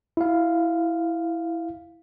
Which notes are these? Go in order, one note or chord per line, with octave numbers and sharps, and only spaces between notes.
E4 F5